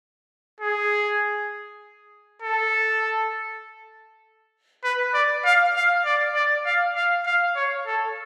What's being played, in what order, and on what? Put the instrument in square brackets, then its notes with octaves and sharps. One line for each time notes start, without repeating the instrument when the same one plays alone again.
[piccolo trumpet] G#4
A4
B4
D5
F5
F5
D5
D5
F5
F5
F5
C#5
A4